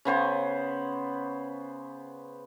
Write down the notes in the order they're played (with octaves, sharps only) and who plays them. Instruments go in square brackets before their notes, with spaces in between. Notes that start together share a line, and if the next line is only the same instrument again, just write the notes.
[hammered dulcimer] C#3 B3 C5 C#5